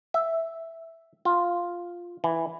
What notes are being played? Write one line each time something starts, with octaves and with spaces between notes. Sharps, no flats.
E5
F4
E3